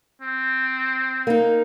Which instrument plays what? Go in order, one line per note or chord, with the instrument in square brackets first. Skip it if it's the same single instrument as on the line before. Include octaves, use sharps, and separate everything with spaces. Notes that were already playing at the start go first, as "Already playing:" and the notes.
[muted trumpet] C4
[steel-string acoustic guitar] A#3 D#4